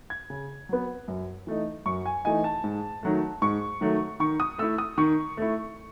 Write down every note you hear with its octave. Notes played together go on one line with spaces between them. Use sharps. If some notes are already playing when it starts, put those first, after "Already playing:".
G#6
C#3
F#3 B3
F#2
E3 A3 D#4
F#2 C#6
G#5
E3 A3 D#4 G#5
A5
G#2
D#3 F#3 A3
G#2 C#6
D#3 F#3 A3
D#3 C#6
D#6
A3 E4 E6
D#6
D#3 C#6
A3 E4